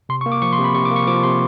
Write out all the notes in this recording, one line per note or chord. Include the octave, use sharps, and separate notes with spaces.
C3 C6
C#6
A#3
D6
F3 C#6
C6
C3
B5
C3 C#6
D6
A#3
C#6
F3 D6
C3 C6